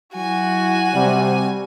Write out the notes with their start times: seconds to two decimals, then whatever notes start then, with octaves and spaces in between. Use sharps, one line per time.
0.16 F#3 E4 F#4 G#5
0.94 C3 G3